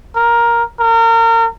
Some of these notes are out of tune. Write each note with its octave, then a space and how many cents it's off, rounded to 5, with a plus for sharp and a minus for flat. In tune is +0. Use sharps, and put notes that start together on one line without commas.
A#4 +10
A#4 -30